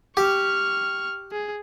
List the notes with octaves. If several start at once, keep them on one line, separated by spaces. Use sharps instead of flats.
G4 C#6 F6
G#4